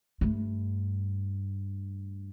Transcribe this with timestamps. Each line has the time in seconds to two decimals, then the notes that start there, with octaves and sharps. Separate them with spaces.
0.21 G2 A3